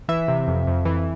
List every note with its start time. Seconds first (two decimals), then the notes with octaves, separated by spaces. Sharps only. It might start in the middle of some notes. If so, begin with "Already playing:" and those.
0.08 E3 E5
0.28 C3
0.48 F2
0.67 F2
0.85 E3